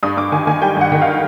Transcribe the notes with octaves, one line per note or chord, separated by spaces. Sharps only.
G2 D#6
G2 D6
D#3 G#5
D#3 G#5
G3 G5
G2 F#5
D#3
F5